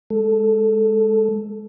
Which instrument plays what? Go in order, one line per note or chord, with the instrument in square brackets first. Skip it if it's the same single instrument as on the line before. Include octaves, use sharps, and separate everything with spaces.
[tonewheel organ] G#3 A4